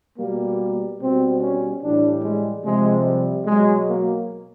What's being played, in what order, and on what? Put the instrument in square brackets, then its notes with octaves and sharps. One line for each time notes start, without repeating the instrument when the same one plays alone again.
[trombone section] B2 G3 A#3
B2 G3 C4
C#4
A2 E3 G3 D4
G#3
C3 F3 G#3
G3
B2 F#3 G#3
A#3